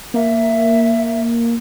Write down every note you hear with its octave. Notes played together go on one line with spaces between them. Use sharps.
A#3 E5